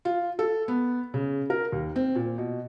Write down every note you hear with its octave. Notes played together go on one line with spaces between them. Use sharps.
F4
A4
B3
C#3
A#4
D#2
C4
A#2
B2